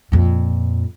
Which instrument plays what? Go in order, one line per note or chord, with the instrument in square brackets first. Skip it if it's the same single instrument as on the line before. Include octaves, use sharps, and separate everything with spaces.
[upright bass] F2 A#2